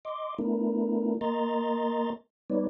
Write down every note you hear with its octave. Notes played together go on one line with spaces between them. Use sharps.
D#5 C6 D6
A3 B3 D4 E4 A#4
A#3 A#4 D#5 A#5 C6 A6
G3 B3 D#4 B4 C#5 D5